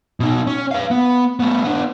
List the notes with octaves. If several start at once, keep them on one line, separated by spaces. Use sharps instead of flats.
B2 D#4
C#4
B4 F5
B3
A3 B3
B3 D4